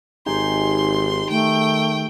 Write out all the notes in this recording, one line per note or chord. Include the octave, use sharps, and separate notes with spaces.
G#1 D#4 G4 G#4 C6
D#3 A3 G5